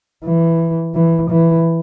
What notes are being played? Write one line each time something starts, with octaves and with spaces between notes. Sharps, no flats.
E3
E3
E3